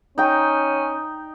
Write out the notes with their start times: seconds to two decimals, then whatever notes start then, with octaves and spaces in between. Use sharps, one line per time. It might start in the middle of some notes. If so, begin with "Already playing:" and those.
0.18 C#4 D#4 G5